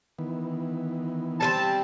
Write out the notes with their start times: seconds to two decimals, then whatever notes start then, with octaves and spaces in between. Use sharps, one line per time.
0.19 D#3 E3 B3
1.41 G3 A3 C4 A5